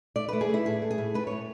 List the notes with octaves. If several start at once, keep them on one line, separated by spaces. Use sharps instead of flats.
A3 D5
A3 B4
G#4
A3 E4
A2 G#4
A3
G#4
A2
A3 B4
A2 C#5